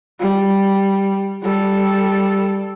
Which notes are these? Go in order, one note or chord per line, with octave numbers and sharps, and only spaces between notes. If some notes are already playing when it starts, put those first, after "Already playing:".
G3
G3 A4